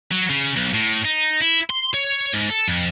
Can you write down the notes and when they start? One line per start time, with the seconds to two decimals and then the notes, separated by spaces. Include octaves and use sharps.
0.12 F#3
0.30 C#3
0.56 B1
0.74 A2
1.05 D#4
1.40 E4
1.70 C6
1.94 C#5
2.33 G#2
2.50 A4
2.68 F2